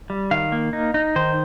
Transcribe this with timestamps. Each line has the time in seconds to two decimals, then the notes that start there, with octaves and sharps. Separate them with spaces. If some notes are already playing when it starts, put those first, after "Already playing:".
0.10 G3
0.31 D#3 F5
0.52 A#3
0.73 D#4
0.94 D#4
1.16 D#3 C5